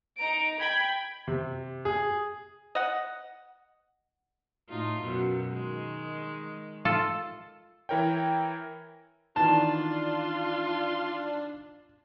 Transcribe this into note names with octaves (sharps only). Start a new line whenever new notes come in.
D#4 A#5 D7
G5 B5 G#6
C3
G#4
D#5 F#5
A2 D#4 F4
F#2 B2
D#3 G#3
F4 A4
E3 E4 A#4 C#5 G5
D#3 E3 B3 D4 F4 A5